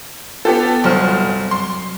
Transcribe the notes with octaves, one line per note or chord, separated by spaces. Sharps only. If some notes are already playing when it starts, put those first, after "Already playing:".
B3 F4 G4 A4
G1 C2 F#3 C5 F6
C6